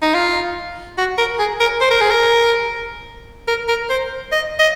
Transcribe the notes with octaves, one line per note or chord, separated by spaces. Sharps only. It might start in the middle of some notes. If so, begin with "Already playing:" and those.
D#4
F4
F#4
A#4
G#4
A#4
C5
A#4
G#4
A#4
A#4
A#4
C5
D#5
D#5